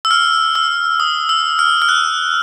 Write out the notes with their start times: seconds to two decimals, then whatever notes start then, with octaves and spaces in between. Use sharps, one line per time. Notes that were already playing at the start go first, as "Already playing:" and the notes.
0.05 E6
0.11 F6
0.55 E6
1.00 D#6
1.29 E6
1.59 F6
1.82 F6
1.89 F#6